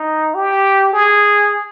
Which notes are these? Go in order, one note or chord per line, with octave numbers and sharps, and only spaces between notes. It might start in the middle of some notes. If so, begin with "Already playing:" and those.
Already playing: D#4
G4
G#4